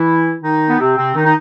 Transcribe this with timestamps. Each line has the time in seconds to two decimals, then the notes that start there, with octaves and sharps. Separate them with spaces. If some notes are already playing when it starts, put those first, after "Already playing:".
Already playing: E3 E4
0.41 D#3 D#4
0.67 B3
0.78 C3 C4
0.96 C3 C4
1.15 D#3 D#4
1.25 D#4